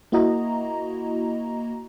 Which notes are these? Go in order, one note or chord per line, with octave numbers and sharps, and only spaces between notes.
A#3 E4 F#4 D#5 A#5